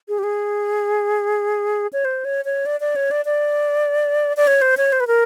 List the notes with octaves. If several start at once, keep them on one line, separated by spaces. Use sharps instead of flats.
G#4
G4
G#4
C#5
C5
C#5
C#5
D5
D5
C#5
D5
D5
D5
C#5
C5
C#5
C5
B4
A#4